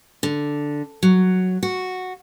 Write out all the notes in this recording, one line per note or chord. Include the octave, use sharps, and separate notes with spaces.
D3
F#3
F#4